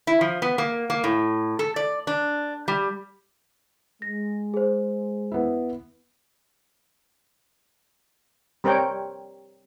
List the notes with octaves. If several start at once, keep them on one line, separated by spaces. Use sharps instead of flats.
E4
F3
B3
A#3
A#3
A2
A4
D5
D4
G3
G#3 A#6
G#4 C5
B3 E4
G3 C4 A#4 C#5 G5